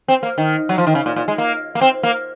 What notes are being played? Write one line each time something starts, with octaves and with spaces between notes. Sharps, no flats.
C4
A#3
D#3
F#3
F3
D#3
C#3
A#2
A#2
G#3
A#3
A#3
C4
A#3